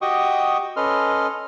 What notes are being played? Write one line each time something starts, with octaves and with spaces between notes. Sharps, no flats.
F#4 G4 D#5 G5 C#6 D#6
C#4 A4 B4 D#5 C6 F6